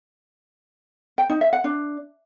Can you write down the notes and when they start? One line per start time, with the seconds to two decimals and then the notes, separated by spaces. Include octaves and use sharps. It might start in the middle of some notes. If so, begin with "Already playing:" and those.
1.18 G5
1.30 D#4
1.41 E5
1.53 F#5
1.64 D4